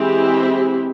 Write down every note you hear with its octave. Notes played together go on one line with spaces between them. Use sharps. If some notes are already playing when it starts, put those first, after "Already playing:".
Already playing: E3 G#3 C4 E4 G4